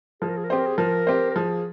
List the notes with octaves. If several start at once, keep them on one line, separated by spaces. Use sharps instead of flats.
F3 G#4
A#4
G#4
A#4
C4 G4 G#4 C5
A#4
G#4
F3 A#4
C4 G4 C5
A#4
F3 G#4